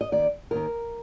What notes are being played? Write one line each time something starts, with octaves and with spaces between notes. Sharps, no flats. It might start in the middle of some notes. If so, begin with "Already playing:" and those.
D#5
D#2 D#3 D5
D#2 D#3 A#4